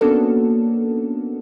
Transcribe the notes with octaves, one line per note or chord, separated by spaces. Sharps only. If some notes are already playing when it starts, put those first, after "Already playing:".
A#3 B3 C#4 D4 F#4 A4